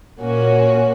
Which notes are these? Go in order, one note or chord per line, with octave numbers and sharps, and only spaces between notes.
A#2 A#3 C#4 F#4